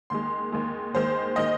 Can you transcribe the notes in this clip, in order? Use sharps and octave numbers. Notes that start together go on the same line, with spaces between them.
D#2 D#3 G#3 C6
D#2 D#3 G#3
D#2 D#3 G#3 C5
D#3 G#3 D#5